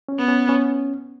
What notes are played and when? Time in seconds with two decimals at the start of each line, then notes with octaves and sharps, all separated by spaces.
0.09 C#4
0.18 B3
0.28 C#4
0.49 C#4